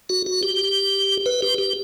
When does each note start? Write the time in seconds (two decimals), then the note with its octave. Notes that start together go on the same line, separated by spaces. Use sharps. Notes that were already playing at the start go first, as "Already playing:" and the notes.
0.09 F#4
0.26 F#4
0.43 G4
1.26 B4
1.42 G4
1.58 G4